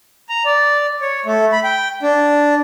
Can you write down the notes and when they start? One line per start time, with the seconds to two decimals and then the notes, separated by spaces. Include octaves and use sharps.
0.29 A#5
0.45 D5
1.01 C#5
1.26 A3
1.52 B5
1.64 G5
2.03 D4